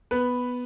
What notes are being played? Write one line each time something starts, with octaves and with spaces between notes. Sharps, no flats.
B3 B4